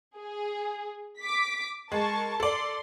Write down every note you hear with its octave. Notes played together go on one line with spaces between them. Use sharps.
G#4
D6 B6
G#3 A#4 A5 C#6
A4 D5 C6